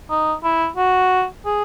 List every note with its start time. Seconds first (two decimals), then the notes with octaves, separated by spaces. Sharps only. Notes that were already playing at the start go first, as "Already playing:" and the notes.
0.10 D#4
0.44 E4
0.77 F#4
1.46 G#4